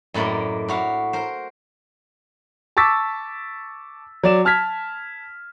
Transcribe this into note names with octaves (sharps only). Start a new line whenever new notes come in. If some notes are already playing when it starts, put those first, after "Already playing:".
F#2 A2 A#3 D5 D#5
A2 F#4 F5
A#4 C5
A5 C#6 D6 E6 A6 B6
F#3 D5 E7
A5 F6 G#6 B6